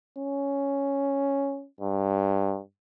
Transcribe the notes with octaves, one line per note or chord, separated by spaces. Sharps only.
C#4
G2